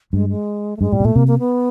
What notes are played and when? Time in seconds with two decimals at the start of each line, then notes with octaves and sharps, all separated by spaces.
0.13 G2 G#3
0.29 G#3
0.77 A3
0.81 G2 G#3
0.92 A2 G3
1.00 B2
1.05 A#2 A3
1.16 C3 A#3
1.27 A#3
1.39 B3